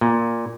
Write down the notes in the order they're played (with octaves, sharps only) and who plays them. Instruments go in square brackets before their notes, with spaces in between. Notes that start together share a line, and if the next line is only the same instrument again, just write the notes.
[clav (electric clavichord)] A#2